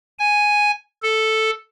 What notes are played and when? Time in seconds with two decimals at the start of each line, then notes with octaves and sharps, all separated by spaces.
0.19 G#5
1.03 A4